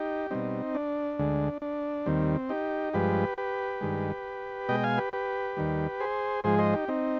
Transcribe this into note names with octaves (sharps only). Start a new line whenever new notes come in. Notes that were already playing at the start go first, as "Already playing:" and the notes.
Already playing: D#4 G4
B2 G3 C4 D#4
D4
D2 D3 G#3
D4
D#2 D#3 G3 C4
D#4 G4
G2 F3 G#3 G4 B4
G4 B4
G2 D#3 G#3
B2 G#3 D#5 G5
F5 G#5
G4 B4
G4 B4
D#2 D#3 G3
G#4 C5
G#2 F3 G#3 G#4 C5
C5 D#5
D#4 G4
C4 D#4